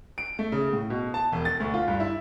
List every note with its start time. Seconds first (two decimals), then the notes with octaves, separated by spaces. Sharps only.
0.18 D7
0.39 A3
0.52 C#3
0.73 A2
0.90 B2
1.14 A5
1.32 E1
1.45 A6
1.60 D2
1.74 F4
1.88 G2
2.00 E4